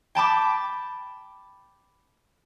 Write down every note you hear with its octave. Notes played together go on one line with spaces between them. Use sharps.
G5 A5 B5 D6